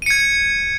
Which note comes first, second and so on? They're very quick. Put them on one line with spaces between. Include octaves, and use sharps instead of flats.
D#7 C#7 G#6